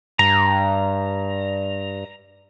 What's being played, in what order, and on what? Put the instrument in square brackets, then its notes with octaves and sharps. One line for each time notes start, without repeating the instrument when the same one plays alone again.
[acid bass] G2 [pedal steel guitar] A#5